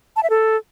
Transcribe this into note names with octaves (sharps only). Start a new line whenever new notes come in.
A5
E5
A4